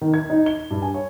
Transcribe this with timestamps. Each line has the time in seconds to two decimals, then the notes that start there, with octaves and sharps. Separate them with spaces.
0.01 D#3
0.14 G#6
0.30 D#4
0.46 G7
0.71 G2
0.82 G#5
0.94 C#5